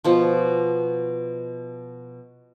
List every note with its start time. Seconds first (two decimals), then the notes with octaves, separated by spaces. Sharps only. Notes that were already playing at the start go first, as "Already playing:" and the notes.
0.04 B2 F3